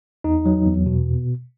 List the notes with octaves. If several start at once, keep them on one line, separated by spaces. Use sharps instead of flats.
E2 D#4
F#3
E2
B2